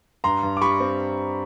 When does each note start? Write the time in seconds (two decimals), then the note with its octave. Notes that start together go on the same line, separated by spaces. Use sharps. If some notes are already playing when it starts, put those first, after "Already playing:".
0.24 G2 A#5 C6
0.43 G2
0.57 D6
0.62 G3 B5 C#6
0.80 C4